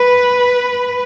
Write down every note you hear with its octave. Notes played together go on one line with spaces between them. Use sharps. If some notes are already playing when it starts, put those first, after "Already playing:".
Already playing: B4